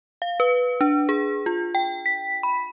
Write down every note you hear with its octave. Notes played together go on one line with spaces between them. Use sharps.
F5
B4
D4
G#4
F4
G5
B6
B5